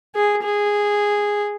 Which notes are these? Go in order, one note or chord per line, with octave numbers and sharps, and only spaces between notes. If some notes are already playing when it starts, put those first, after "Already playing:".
G#4
G#4